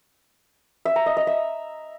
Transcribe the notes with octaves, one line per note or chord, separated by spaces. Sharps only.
E5
A#5
D#5
D#5
E5